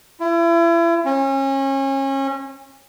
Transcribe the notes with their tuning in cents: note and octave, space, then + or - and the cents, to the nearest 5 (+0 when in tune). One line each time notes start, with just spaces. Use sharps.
E4 +35
C#4 -30